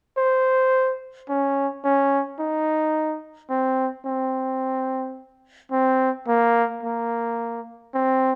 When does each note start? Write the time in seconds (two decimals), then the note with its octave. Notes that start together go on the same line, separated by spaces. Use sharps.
0.17 C5
1.29 C#4
1.84 C#4
2.39 D#4
3.50 C4
4.05 C4
5.71 C4
6.28 A#3
6.83 A#3
7.94 C4